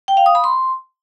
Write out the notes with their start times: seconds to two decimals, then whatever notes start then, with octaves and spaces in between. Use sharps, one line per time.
0.08 G5
0.17 F5
0.26 D#6
0.35 B5
0.44 C6